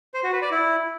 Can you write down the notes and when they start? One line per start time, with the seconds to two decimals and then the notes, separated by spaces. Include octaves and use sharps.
0.14 C5
0.23 F#4
0.33 B4
0.42 D5
0.51 E4